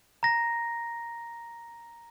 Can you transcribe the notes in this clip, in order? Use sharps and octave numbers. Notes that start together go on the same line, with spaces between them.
A#5 A#6